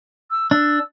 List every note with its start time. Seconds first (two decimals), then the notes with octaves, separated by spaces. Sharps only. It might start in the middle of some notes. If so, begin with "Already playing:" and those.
0.31 E6
0.51 D4 E6